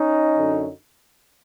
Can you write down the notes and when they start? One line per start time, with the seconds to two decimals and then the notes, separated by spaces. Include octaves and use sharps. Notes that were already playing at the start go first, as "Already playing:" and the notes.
Already playing: C#4 D#4
0.38 F#2 D3 F#3